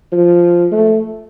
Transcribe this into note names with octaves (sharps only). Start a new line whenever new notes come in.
F3
A3